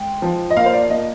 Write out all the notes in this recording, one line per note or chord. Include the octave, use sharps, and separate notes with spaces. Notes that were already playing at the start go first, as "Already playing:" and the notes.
Already playing: G#3 G5
F3
D#5
A#3 F5
C5
D5
A#3 D#5